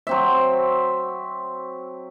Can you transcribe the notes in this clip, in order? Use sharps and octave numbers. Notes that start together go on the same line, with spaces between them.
F#3 C4 E5